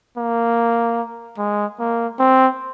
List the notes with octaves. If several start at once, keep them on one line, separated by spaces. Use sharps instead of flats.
A#3
G#3
A#3
C4